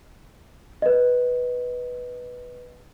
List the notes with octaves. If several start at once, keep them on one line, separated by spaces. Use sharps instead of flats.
B4 D#5